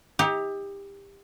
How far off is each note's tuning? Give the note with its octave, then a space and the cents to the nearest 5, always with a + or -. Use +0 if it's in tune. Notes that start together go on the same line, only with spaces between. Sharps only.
D#4 +35 G4 +25